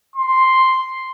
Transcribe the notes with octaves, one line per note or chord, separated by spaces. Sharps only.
C6